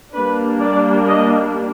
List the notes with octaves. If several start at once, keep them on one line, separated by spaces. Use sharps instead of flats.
G3 A#3 D4 B4
D5
D#5